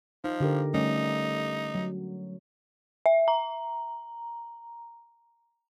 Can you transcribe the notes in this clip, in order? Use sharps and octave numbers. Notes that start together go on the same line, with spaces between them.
F3 D#4
D3 G4 A#4
G3 A3 C#4 D#4
F#3
E5
A#5